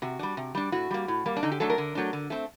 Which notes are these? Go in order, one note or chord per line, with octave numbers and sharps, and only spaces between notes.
C3 F#4
G3 D4
C3
G3 D4
A2 F#4
G3 A#3
A2
G3 A#3
D4
D3 D#4
G4
F#3 A3 D4 A4
A#4
D3
F#3 A3 D4
D3
A3 C4